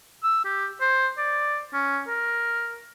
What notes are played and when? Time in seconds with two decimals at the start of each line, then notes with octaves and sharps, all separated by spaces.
0.24 E6
0.45 G4
0.81 C5
1.18 D5
1.73 C#4
2.08 A#4